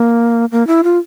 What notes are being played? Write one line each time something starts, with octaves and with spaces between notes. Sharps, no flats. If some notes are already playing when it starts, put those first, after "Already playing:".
Already playing: A#3
A#3
E4
F4